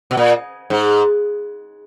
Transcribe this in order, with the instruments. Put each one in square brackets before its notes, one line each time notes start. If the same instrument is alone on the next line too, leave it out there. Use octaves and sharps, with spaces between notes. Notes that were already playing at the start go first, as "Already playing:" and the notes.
[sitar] B2
A#2
G#2